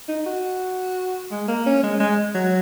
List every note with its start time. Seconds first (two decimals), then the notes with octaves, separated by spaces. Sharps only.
0.08 D#4
0.26 F#4
1.31 G#3
1.48 A#3
1.66 C#4
1.83 G#3
2.00 G#3
2.35 F#3